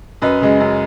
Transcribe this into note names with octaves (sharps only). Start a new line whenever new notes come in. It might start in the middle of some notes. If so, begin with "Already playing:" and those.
F#2 B4 D#5
C#3 G#3
F#2